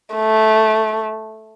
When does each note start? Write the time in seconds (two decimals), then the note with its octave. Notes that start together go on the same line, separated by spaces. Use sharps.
0.15 A3